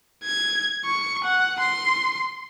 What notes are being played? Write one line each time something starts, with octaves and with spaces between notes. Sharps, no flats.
G#6
C#6
F#5
C6